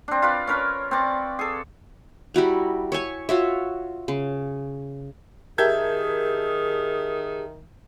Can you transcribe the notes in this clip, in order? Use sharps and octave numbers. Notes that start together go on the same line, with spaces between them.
C4 D4
F4 B4 D5
C#4 A#4 B4 C#5
C4 B4 D5 C#6
G#4 A4
G3 E4 F#4 A#5
C#5 E5 G#5 C#6
F4 F#4 C#5 E5
C#3
D#3 G4 G#4 A#4 E5 A5 G6 G#6